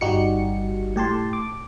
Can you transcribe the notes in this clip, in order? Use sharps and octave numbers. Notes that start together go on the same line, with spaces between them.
G1 G3 D#4 F#4 G4 C#7
A2 G4 A5 C6
D6